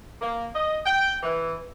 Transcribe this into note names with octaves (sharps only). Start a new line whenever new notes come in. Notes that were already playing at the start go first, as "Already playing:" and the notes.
A#3
D#5
G5
E3